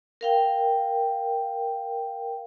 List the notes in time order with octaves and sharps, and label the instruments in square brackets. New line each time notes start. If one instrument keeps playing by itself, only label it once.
[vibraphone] A#4 F5 G5